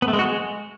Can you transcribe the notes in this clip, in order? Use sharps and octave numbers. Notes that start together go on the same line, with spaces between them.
B3
A3
G#3
F#4
G#3